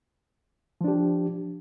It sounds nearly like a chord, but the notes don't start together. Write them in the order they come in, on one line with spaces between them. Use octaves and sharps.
F3 D4 G4